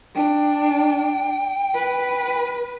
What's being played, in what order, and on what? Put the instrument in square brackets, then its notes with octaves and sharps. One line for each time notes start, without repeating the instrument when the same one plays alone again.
[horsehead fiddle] D4 [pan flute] G5
[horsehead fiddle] B4